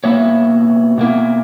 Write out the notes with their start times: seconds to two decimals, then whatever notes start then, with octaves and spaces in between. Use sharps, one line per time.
0.04 B2 A#3 E4 C#5 E5
0.98 B2 A#3 E4